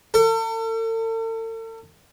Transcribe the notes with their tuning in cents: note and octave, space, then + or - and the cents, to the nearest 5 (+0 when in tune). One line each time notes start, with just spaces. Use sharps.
A4 +40